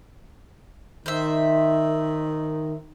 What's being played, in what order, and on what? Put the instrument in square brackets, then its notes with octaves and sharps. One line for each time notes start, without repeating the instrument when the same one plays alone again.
[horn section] D#3 [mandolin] C5 E5